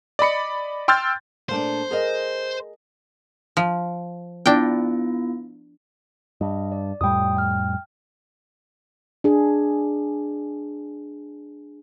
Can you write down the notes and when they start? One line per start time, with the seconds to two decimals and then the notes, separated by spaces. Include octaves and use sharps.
0.19 D5 D#5 B5 C#7
0.88 G5 C6 E6 F6 G6 A6
1.49 A#2 A3 D4 C5
1.91 G#4 A#4 D#5
3.57 F3
4.46 B3 D4 E4 F4 G5
6.41 G2 D#5
6.72 D5
7.01 F2 A2 G3 G5 D#6
7.37 G5 F6
9.24 D4 G#4